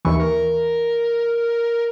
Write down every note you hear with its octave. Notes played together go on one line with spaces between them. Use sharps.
D#2 E3 C#6
A#4